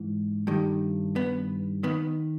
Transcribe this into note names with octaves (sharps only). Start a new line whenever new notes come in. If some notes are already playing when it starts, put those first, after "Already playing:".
Already playing: G#2 E3
G2 D#3
B3
D#3 B3